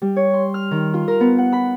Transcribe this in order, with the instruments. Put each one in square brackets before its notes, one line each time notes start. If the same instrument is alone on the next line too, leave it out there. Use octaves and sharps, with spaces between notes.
[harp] G3
C#5
C6
F6
D#3
F4
A#4
B3
F#5
B5